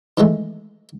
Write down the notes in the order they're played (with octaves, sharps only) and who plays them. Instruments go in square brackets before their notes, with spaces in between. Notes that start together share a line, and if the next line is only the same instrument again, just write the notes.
[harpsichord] D#3 E3 G#3 A3